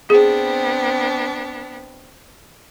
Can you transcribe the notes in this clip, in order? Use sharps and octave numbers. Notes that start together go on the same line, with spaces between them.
B3 C4 D4 G#4